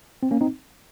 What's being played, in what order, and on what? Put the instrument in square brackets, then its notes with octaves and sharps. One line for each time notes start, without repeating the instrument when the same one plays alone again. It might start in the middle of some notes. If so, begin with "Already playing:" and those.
[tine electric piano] C4
A#3 C#4
C4 D#4